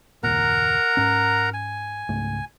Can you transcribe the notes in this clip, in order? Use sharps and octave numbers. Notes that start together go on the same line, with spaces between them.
F#1 D#2 A#2 A#4 F#5 A#5
G#2 C#4
G#5
C#2 G#2 A3